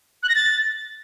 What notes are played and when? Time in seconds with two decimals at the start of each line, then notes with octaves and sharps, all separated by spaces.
0.23 F#6
0.29 A#6
0.35 A6